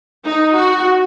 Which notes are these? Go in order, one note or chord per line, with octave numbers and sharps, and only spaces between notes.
D#4
F#4